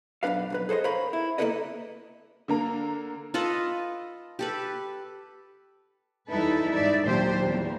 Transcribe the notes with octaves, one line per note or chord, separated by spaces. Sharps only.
B1 F#2 D4 B4 F5
B1 F2 B4
G#4 A4 C5 D5 D#5
A#4 C5 C#5 F5 B5
E4
A#3 B3 E4 A4 B4 D#5
D3 A#3 A#5
F4 A4 B4 D#5
G4 A4 B4
E2 G3 D#4 E4 A4 B4
G#2 D#4 D5 E5
D#2 A#2 F#3 D4 G4 C5
E2 G3 A#3